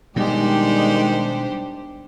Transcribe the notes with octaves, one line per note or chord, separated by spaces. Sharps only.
B2 D#3 G3 G#3 D4 G4 C5